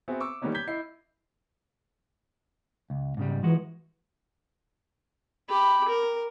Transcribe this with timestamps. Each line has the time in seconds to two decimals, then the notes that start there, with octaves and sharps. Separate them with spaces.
0.08 B3 C4 F#4 G#4 E5
0.21 C#6 D6 E6
0.42 D#3 G3 A#3 B3 C#4 D#4
0.55 G6 G#6 B6 G7
0.67 E4 D#5 C7
2.90 C#2
3.17 G#2 C#3 G3
3.43 E3 F3 G#3 F#4
5.49 G4 B5
5.88 A#4